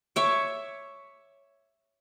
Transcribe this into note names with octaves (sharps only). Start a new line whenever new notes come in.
C#5 E5 D6